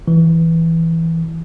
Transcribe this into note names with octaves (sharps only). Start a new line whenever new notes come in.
E3